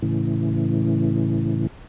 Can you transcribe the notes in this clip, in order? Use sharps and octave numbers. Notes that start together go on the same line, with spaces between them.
A2 C#3 E3